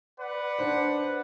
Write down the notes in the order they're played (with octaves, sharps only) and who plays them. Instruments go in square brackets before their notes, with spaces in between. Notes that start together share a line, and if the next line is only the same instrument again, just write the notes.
[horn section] B4 D5 F#5
[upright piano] D4 C5